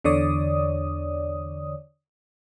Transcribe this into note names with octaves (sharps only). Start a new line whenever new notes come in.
E2 D3 C#5 D5 D#6